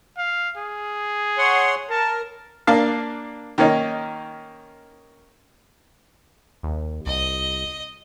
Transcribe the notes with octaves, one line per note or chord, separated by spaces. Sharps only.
F5
G#4
C#5 F#5 C6
A#4 A5
A#3 D4 F5
D#3 A#3 C#4 D#4
D#2
C2 D#5